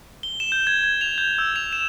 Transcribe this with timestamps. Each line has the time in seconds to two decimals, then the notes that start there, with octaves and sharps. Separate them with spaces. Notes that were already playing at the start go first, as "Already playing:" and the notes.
0.23 G7
0.40 E7
0.52 G6
0.67 G#6
0.83 G#6
1.01 F7
1.18 G6
1.38 E6
1.56 F7
1.73 E7